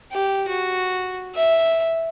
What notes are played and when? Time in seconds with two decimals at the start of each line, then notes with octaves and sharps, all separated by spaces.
0.12 G4
0.49 F#4
1.35 E5